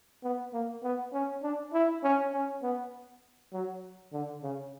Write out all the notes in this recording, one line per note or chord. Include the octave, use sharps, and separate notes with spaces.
B3
A#3
B3
C#4
D4
E4
C#4
C#4
B3
F#3
D3
C#3